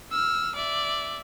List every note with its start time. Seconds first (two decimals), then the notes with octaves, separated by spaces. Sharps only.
0.11 E6 F6
0.56 D5 E5